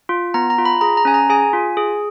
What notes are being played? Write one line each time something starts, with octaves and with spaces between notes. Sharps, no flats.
F4
B3 A#5
A#5
F4
B5
G#4 A#5
A#5
C#4 G#5
A#5
G#4 G#5
F4
G#4